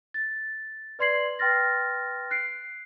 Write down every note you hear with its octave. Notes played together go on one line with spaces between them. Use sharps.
A6
B4 D5 C6 G#6 C7 F#7
B4 G5 C6 F6 A6 A#6
F#6 C7 D7